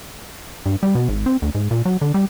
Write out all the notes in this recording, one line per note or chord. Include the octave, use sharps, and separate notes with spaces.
G2
G3
B2
G#1
C4
D2
G#2
A#2
F#3
D3
G3